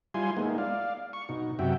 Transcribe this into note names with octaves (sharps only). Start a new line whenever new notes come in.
G3 E4 F4 G#5 C6
G#3 A#3 B3 D#4 E4
D5 F5
C#6
B2 D#4
F#2 C3 F#4 E5 G5